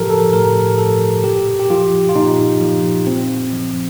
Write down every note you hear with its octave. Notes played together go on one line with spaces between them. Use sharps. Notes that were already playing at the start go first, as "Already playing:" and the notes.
Already playing: A2 F3 G4 A4 A#4
A4
A2 A#4
F3 A4
A#2 G4
G4
F3 F4
F4
A#2 D#4
F3
A#2 C4
F3